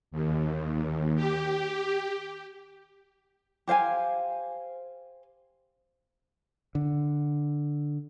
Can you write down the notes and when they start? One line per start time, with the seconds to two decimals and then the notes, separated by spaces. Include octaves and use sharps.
0.11 D#2
1.15 G4
3.68 G4 C5 F5 G#5
6.75 D3